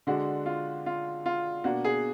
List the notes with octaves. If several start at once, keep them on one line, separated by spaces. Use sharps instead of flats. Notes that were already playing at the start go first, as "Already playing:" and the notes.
D3 G#3 D4 F#4
F4
F4
F4
B2 A#3 D4 F#4
G#4